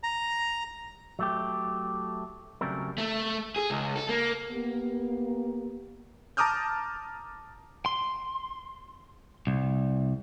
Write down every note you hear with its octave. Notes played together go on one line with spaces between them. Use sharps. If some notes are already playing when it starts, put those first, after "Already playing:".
A#5
F#3 A3 G4
C#3 F#3 G3 A3 C4 A#4
A3
G#4
C#2
A4
A#3
A#3 B3 G4
A5 A#5 D6 D#6 F6 G6
C6
C2